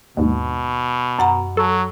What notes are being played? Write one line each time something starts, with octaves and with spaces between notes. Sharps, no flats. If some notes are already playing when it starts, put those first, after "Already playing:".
D#2 G#2 B2
F#2 F#5 A#5
F#3 A4